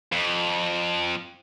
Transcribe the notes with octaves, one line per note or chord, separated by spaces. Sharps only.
F2